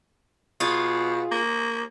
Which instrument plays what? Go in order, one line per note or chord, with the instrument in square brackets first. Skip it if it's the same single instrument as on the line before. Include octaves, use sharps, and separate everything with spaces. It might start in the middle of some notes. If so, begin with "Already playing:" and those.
[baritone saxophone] B2 [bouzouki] F4 G#4
[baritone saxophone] A#3